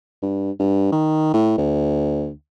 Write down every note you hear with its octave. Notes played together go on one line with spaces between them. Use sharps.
G2
G2
D#3
A2
D2